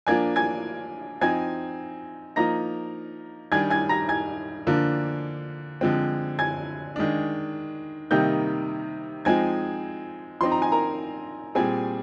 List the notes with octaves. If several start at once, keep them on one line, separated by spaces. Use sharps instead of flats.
F3 A#3 D4 G#5 G#6
G#5 G#6
F3 C4 D#4 G#5 G#6
F3 A#3 D#4 A#5 A#6
D#3 G3 D4 G#5 G#6
G#5 G#6
A#5 A#6
G#5 G#6
D3 F3 A#3 D4
D3 F3 G#3 C4
G#5 G#6
D#3 G#3 D4
C3 D#3 G3 A#3 D#4 G5 G6
F3 G#3 C4 D#4 G#5 G#6
F3 C4 D#4 C6
A#5
G#5
A#4 A#5
A#2 G3 C4 G#4 G#5